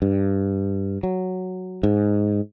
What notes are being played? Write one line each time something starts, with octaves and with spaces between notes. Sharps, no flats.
G2
F#3
G#2